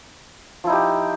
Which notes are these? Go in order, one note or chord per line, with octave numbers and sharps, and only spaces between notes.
F3 D#4 E4 G4